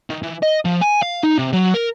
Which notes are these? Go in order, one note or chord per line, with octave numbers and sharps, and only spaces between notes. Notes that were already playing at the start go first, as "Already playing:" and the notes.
D#3
E3
D#5
F3
G#5
F5
D#4
C3
F#3
A#4